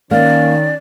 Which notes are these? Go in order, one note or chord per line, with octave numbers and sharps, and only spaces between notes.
D#3 A#3 C#4 D5